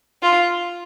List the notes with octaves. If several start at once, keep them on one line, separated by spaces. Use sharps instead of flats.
F4